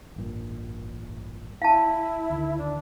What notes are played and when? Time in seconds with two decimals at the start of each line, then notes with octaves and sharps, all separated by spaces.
0.16 A1 G2 A#2
1.62 E4 F5 A5
2.30 D2 D3 D#3
2.58 D4